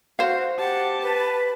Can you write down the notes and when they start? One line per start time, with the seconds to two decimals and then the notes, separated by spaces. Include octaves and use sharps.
0.19 F#4 C5 F5
0.59 G4 F#5 A5
1.02 B4